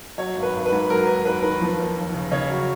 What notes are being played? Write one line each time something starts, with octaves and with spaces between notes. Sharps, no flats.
F#3 C#5
G#1
B4
G#1
B4
G#2
F#3 A#4
D#2 B4
D#2 B4
D#3 B4
F3
D#2
D#2
C#3
C#3 C#5
F#3